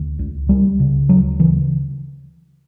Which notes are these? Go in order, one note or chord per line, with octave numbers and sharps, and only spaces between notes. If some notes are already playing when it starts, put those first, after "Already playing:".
Already playing: D2
C#2
C#2 G3
C#3
D2 F#3
C#3 E3